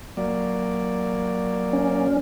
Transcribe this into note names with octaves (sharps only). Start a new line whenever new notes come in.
F#3 A#3 D5
C#4